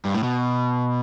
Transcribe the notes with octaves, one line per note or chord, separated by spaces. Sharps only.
G2
A2
B2